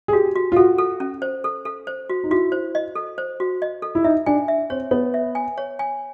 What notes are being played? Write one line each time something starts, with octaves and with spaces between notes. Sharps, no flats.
G#4
F#4 G4
F#4
F4
F#4 A4
A4
C#4
C5
A4
A4
C5
F#4
D#4
E4 F#4
C5
D#5
A4
C5
F#4
D#5
A4
E4
D#4 E5
D4 G#5
E5
C4 C#5
B3 C#5
E5
G#5
C#5
G#5